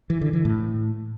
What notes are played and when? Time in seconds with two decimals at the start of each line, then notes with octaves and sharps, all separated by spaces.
0.10 E3
0.21 D3
0.33 E3
0.45 A2